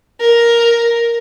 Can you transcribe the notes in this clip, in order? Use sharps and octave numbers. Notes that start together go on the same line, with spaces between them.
A#4